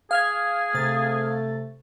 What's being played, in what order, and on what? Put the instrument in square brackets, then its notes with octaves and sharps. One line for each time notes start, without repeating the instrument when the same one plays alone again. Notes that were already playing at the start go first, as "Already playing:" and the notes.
[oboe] G#4 [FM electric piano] F5 F6 G#6
[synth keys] C3 A6 [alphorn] A3